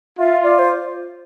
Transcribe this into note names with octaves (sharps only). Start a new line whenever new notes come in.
F4 E5
D5
C5